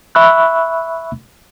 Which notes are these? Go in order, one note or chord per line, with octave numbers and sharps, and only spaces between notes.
E5 B5 C#6 E6 F#6